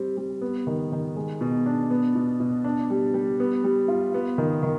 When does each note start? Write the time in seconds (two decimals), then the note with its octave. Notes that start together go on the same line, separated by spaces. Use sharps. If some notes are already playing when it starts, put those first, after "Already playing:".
Already playing: G3 C4
0.17 G3
0.41 B3
0.67 D#3
0.92 D#3
1.16 G#3
1.41 B2
1.66 D4
1.90 B3
2.15 B2
2.40 B2
2.64 D4
2.90 G3
3.14 G3
3.40 B3
3.64 G3
3.88 F4
4.14 B3
4.38 D#3
4.63 D#3